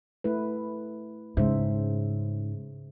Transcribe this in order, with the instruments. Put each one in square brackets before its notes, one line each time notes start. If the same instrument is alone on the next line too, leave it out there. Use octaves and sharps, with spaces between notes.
[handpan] A3 E4 B4
[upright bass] G#2 [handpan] C#3 C5 E5